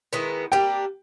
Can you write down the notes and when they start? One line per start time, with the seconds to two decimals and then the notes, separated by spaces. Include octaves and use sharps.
0.13 D#3 G#3 B3 E4
0.52 G3 A#3 D4 G5